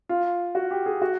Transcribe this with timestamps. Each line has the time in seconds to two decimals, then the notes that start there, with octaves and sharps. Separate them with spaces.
0.09 F4
0.55 F#4
0.71 G4
0.86 G#4
1.02 F#4